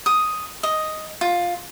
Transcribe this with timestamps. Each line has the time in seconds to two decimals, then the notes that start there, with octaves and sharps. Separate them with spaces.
0.06 D#6
0.63 D#5
1.21 F4